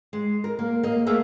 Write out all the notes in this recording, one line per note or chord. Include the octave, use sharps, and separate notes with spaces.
G#3
A#4
A#3
A#3 D#5
A3 A#3 G#4 E5